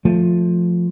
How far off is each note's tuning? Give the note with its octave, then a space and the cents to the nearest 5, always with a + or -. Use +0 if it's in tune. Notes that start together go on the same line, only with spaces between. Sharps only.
F3 +5 A3 +0